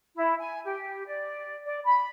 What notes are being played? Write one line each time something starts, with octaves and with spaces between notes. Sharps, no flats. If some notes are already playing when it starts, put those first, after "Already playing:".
E4
G#5
G4
D5
D5
B5